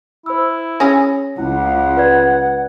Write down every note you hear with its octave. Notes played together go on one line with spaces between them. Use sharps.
E4 C5 E6
C#4 G#4 A#6
C#2 E4 F#5
B4 D5 G#6